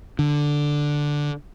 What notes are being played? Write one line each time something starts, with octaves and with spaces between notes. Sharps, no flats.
D3